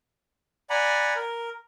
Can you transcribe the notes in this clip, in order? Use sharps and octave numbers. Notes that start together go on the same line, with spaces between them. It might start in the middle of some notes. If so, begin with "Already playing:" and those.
D5 F#5 G#5 A#5 B5
A#4